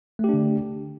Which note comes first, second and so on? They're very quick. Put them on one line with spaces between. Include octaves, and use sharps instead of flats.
A3 G4 D4 D3